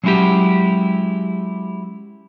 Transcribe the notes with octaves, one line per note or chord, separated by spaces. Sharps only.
F#3 G#3 C#4 E4 F#4 G4